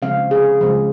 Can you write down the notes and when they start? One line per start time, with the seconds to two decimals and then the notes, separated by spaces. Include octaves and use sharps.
0.02 C#3 F3 G#3 C4 F5
0.31 G#4
0.61 C#3 F3 G#3 C4